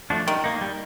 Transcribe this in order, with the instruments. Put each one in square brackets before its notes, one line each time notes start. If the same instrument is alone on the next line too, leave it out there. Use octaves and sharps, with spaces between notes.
[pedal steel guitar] F3 A3 D4 F#4
[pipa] D#3 [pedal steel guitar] G3
[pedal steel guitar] A#3 D#4
G3